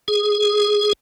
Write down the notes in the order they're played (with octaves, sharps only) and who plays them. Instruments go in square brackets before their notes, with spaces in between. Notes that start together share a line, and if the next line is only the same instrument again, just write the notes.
[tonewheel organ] G#4